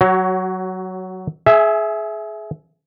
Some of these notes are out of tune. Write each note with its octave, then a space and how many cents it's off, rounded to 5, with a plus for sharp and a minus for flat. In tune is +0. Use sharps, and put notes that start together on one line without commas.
F#3 +10 F#4 +35 C#5 +0
G#4 +25 E5 +0 G#5 +0